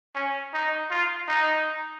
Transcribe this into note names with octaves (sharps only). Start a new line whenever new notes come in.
C#4
D#4
F4
D#4